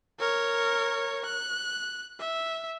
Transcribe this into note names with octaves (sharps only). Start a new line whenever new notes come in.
A#4 C#5
F#6
E5